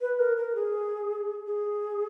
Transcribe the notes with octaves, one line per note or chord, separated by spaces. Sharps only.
B4
A#4
A#4
G#4
G#4